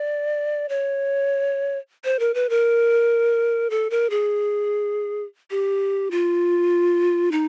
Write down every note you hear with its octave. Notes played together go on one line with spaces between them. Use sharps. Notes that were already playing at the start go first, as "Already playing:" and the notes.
Already playing: D5
C#5
C5
A#4
B4
A#4
A4
A#4
G#4
G4
F4
D#4